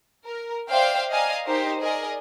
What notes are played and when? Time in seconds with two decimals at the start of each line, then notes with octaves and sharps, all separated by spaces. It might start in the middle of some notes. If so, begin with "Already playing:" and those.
0.25 A#4
0.68 C5 D5 E5 F5 G5
1.09 D5 D#5 F5 G#5 A#5
1.46 D#4 G4 A#4 C5
1.80 G#4 A#4 D5 D#5 G#5